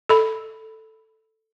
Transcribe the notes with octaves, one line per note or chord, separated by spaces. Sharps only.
A4 B5